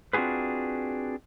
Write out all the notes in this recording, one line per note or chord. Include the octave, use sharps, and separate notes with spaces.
C4 D4 F4 F#4 G#4 B4